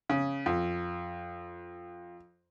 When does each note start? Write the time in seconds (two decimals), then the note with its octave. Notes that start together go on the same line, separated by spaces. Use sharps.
0.10 C#3
0.46 F2